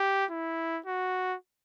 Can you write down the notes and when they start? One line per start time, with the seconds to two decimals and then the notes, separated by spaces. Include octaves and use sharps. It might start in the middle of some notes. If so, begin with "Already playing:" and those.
Already playing: G4
0.31 E4
0.86 F#4